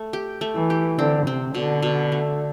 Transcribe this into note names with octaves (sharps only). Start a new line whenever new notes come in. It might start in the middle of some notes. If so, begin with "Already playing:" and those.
Already playing: A3
G4
A3
E3
G4
D3 C4
C3 C4
B2 D3
B2
A3